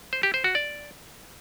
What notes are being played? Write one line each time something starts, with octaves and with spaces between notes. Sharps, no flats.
C5
G4
C5
F#4
D5